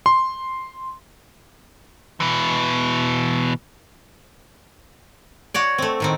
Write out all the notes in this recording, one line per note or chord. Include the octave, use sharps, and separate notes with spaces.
C6
B2 E3
F#4 C#5 D5
A3 C4
A2 D#3 C4